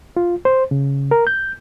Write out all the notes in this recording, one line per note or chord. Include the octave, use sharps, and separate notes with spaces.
F4
C5
C#3
A#4
G6